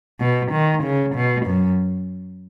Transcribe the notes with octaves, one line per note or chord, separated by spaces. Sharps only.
B2
D#3
C#3
B2
F#2